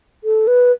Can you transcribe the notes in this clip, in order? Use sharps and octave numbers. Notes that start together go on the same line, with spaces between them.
A4
B4